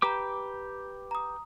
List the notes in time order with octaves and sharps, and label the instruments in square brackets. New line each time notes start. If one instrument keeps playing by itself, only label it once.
[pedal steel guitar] G4 B4 D6 [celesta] A#5 G6
[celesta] A#5 D#6